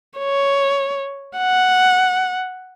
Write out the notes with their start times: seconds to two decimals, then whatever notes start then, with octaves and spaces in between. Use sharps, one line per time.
0.18 C#5
1.37 F#5